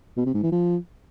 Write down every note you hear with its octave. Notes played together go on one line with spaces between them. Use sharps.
B2
C3
G#2
E3
F3